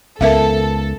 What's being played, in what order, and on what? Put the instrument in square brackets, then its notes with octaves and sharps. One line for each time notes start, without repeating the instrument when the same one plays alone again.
[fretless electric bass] C#2 B3 [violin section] A4 [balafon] A#4 E5 F5